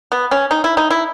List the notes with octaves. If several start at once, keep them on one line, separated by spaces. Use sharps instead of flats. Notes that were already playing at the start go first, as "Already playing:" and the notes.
B3
C#4
D#4
E4
D#4
E4